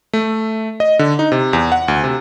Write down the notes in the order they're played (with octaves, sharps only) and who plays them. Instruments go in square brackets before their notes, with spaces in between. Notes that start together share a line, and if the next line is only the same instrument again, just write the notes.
[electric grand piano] A3
D#5
D3
D#4
C3
E2
F#5
D2
C3